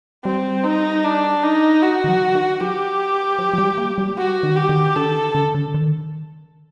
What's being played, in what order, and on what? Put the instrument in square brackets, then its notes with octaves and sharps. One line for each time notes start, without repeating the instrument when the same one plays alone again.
[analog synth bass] G3 [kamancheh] C4
[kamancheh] D#4
D4
D#4
F#4
[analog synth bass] D#3
F#3
D#3
[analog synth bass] F#3 [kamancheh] G4
[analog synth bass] F#3
F#3
G3
A#3
G3
[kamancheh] F#4
[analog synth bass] D#3
[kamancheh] G4
[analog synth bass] D#3
[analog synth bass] D3 [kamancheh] A4
[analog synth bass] D#3
D3
D3
D3
D#3